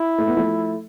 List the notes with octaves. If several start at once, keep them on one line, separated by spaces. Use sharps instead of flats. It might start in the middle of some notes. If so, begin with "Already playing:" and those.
Already playing: E4
A3
B3
F3 A3